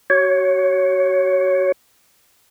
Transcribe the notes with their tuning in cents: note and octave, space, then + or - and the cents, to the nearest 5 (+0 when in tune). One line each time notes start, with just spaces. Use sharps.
F#4 +30 C#5 +0